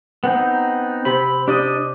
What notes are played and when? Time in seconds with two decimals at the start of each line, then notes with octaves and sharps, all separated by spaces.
0.24 B3 C4 D#4
1.05 C3 B5
1.48 D4 G4 D5 D#5